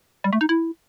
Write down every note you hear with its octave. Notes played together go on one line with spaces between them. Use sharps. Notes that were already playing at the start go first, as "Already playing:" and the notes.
G3
A3
D#4
E4